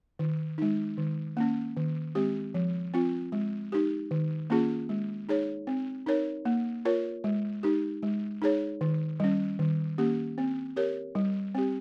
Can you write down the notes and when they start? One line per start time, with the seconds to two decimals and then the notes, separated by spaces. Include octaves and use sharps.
0.19 D#3
0.58 G#3 D#4
0.98 D#3
1.37 A#3 C#4
1.76 D#3
2.15 G#3 C4 G4
2.54 F3
2.94 C4 F4
3.32 G#3
3.72 D#4 G4
4.11 D#3
4.50 A#3 C#4 F4 G#4
4.89 G#3
5.29 D#4 G#4 C#5
5.67 C4
6.06 D#4 A#4 C#5
6.45 A#3
6.85 F4 A#4 C#5
7.24 G#3
7.63 D#4 G4
8.03 G#3
8.42 D#4 G#4 C#5
8.81 D#3
9.20 G3 C#4
9.59 D#3
9.98 A#3 C#4 G4
10.38 C4
10.76 G4 A#4 C#5
11.15 G3
11.55 C4 G4